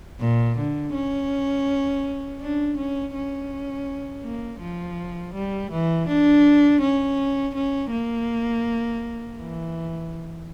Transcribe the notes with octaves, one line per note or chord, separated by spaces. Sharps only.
A#2
D3
C#4
D4
C#4
C#4
A#3
F3
G3
E3
D4
C#4
C#4
A#3
E3